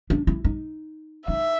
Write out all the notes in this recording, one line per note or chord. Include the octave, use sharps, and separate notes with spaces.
D4
E4
D#4
D#4 E5